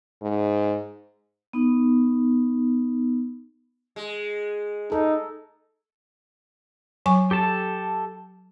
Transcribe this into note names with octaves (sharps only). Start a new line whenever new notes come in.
G#2
B3 D#4
G#3
D#4 A4
F#3 G#5 C#6
G4 A4 A5